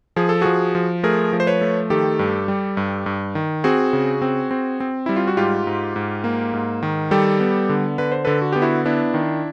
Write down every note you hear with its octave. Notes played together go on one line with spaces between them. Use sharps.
F3 G#4
A4
F3 F#4 G#4
F3
A3 G#4 A#4
F3
C5
B4 C#5
A3
D#3 G4 A4
G2
G3
G2
G2
D#3
C4 F#4 G#4
C#3
C4
C4
C4
G3 E4
F4
F#4
G#2 F4 G4
G#2
G#2
A#3
G#2
D#3
G3 G4 A4
B3
D3
D3 B4
C5
D3 A4 B4
F#4
B3 G4
E4 F#4
B3 D4 E4
D#3